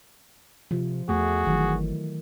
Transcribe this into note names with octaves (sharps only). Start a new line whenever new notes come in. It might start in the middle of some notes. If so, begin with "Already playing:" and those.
C3 F3 F4
E2 A3 F#4 G#4
G1 D#3 E3 F#3